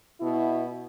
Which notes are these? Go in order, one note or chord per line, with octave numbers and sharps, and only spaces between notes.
B2 E4